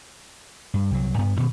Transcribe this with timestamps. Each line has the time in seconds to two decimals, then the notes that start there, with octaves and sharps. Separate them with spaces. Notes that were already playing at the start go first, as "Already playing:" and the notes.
0.74 G2
0.91 C2 F#3
1.18 G2 B3
1.36 D2 B2 D#3